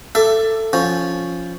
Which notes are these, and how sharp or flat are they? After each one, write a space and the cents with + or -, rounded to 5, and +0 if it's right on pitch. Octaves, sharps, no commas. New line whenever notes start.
A4 +10 E5 +25 D6 +0
F3 +0 C#4 +0